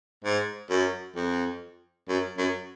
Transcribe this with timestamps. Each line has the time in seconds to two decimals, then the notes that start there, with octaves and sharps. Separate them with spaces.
0.24 G#2
0.70 F#2
1.16 F2
2.08 F#2
2.38 F#2